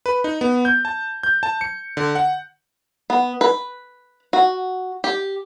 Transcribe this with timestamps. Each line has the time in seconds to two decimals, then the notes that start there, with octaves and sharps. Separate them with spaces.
0.06 B4
0.24 D#4
0.41 B3
0.65 G6
0.85 A5
1.23 G6
1.43 A5
1.61 C#7
1.97 D3
2.15 F#5
3.10 B3
3.41 B4
4.33 F#4
5.04 G4